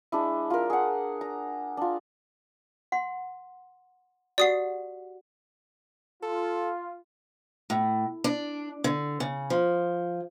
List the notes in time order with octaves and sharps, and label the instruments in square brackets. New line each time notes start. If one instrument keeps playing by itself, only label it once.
[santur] G#3 D4 E4
F4 A#4
G#4 F#5
A#5
D4 F4
[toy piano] F#5 C6
[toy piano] F#4 G4 F#5 [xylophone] D5 D#6 C7
[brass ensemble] F4 [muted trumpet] A4
[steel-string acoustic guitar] A2
D4
D3
C#3
F3